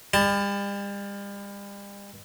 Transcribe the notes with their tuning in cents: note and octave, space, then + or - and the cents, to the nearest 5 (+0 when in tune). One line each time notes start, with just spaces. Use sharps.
G3 +40 A5 +0